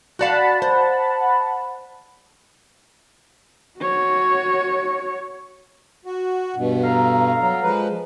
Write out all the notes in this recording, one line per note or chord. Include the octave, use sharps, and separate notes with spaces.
F#4 D5 F5 F#5 A5 B5
C5
F#4 C#5
F#4
G2 B2
A4 F5 A#5
F#3
F3 G#3 B4